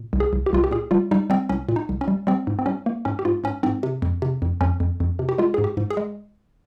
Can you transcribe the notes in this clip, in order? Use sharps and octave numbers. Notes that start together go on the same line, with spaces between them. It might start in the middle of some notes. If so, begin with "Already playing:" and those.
Already playing: A#2
C2
G#4
C2
G4
C2 F4
G4
A#2 G#4
G3 F4
G3 D#4
G3 C4
C2 C#4
A#2
D#4
C2
C#4
G3
G3 C4
G#2
C4
G3 C#4
A#3
G#2 C#4
G4
G#2 F4
G#2 C#4
G#2 C4
C3
F2
C3
F2
F2 C#4
F2
F2
C3
G4
G#3 F4
G#2 G#4
G4
G#2
G#4
G#3